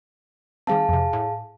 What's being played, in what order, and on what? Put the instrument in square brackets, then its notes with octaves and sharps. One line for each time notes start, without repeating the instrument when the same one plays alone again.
[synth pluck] D#3 G3 C4 [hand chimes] G#4 F5 A5
[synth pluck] F2 C3
A2